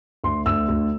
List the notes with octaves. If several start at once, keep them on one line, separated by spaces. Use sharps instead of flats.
D2 C6
D2 E6
D2